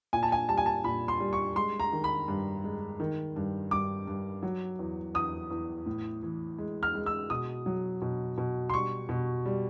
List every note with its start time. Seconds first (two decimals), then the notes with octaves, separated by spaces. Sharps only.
0.13 A#2 G#5
0.23 A5
0.32 G#5
0.48 G3 A5
0.58 G#5
0.66 A5
0.84 A#2 B5
1.08 C6
1.20 G3
1.33 C#6
1.56 G#3 C6
1.80 A#5
1.92 D#3
2.04 B5
2.28 G2
2.64 G#3
3.00 D#3
3.36 G2
3.71 G2 D6
4.07 G2
4.43 F#3
4.79 E2
5.15 E2 D#6
5.51 E2
5.86 A2
6.23 E3
6.58 G#3
6.83 F6
6.95 G#3
7.06 E6
7.30 B2 D#6
7.66 F#3
8.02 B2
8.38 B2
8.70 C6
8.74 G3 C#6
9.09 B2
9.46 G3